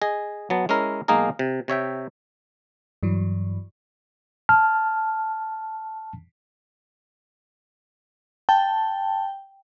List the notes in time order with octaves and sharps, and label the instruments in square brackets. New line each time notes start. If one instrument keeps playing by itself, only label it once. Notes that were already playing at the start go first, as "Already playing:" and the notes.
[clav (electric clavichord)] G#4 D#5
F#3 B3 A5
G#3 C#4 E4 A#4
B1 G#3 A#3 D#4 G#4 A#4
C3
C3 C#5 E5 G5
[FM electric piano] G2 E3 F#3
[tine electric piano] A5 F6
[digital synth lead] G5 [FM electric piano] A5